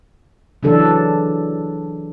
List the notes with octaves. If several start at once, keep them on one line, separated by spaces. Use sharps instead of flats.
C#3 E3 F#3 D4 A4